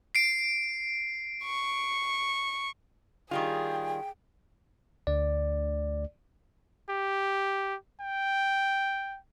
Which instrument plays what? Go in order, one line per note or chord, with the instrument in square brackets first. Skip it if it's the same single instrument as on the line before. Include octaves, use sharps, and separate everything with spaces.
[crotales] C7 D7
[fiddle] C#6
[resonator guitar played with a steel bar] D#3 G3 F4 [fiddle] G#4 [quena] G5
[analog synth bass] D2 [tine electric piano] D5
[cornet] G4
G5